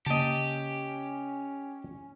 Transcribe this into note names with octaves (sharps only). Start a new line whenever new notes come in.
C#3 A#3 C#4 G4 D#5 A5